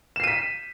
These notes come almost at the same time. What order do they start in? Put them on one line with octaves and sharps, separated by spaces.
E7 C7 D#7 B6